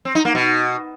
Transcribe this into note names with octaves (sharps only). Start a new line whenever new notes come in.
C4
D#4
A#3
B2